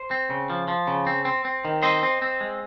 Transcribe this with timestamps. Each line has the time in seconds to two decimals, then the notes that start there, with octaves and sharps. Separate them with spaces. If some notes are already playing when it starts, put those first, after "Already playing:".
Already playing: C5
0.11 C4
0.30 C#3
0.50 F3
0.68 F3
0.87 C#3
1.07 C4
1.25 C4
1.45 C4
1.65 D#3
1.82 C4 C5 D#5
2.03 C4
2.22 C4
2.41 G#3